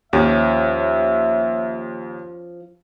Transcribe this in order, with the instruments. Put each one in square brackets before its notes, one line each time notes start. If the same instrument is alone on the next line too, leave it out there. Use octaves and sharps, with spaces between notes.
[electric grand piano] D#2 [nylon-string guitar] F3 C#4 G4 [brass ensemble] E5